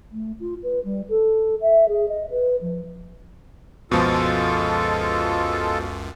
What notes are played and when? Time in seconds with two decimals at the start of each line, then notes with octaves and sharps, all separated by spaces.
0.12 A3
0.40 F4
0.63 B4
0.84 G3
1.09 A4
1.61 E5
1.88 G#4
2.08 D#5
2.30 B4
2.61 F3
3.91 C#2 F#2 B2 F3 G#3 F4 A4